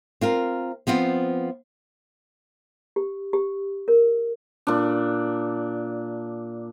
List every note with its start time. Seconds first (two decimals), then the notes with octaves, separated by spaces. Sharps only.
0.21 C4 F4 A#4
0.87 F3 B3 C4 F4
2.96 G4
3.33 G4
3.88 A#4
4.67 A#2 D4